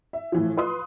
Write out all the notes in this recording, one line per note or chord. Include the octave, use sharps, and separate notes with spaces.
E5
A2 E3 F3
F4 B4 C6 D#6